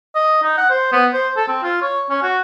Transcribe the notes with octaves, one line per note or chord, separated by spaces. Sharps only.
D#5
D#4
F#5
C5
B3
C5
A4
C4
F4
C#5
C#4
F#4